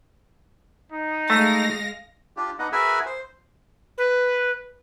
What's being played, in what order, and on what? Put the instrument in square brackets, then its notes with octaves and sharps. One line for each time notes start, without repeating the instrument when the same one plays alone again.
[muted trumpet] D#4
[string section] G#3 F5 A#6 [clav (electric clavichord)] A3
[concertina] D4 F4 G4
B3 D4 D#4 D#5 F#5
F#4 G#4 A#4 B4 E5 G#5
C5
[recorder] B4